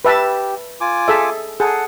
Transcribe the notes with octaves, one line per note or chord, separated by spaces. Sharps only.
G4 B4 E5 A5
F4 G#5 D6
G#4 A4 E5
G#4 A4 F#5